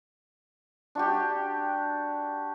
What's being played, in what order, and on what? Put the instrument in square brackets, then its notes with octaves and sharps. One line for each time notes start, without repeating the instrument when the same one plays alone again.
[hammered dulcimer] D4 F#4 G4